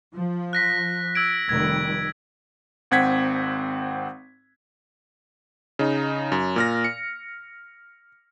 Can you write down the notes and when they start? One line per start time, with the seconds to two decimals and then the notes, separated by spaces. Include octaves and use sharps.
0.13 F3
0.53 F#6 A#6 B6
1.15 E6 G#6 D7
1.49 F1 D#3 G3 G#6
2.91 G#1 C4 F#5 G#6 B6
5.79 C#3 D#4
6.32 F#2
6.56 A#2 F6 A#6
6.84 C#7